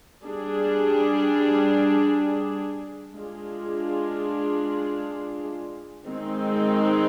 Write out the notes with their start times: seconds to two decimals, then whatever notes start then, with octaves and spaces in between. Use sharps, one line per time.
0.24 G3 D4 G#4
3.15 G#3 D4 F4 G#4
6.06 D#3 G#3 C4 D#4